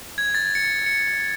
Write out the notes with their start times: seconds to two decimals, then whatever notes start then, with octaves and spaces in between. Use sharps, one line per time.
0.18 G#6
0.35 A6
0.55 C#7
0.86 C#7